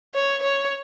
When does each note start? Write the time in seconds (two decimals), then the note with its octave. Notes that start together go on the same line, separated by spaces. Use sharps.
0.14 C#5
0.42 C#5